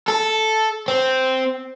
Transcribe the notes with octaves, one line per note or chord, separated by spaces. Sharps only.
A4
C4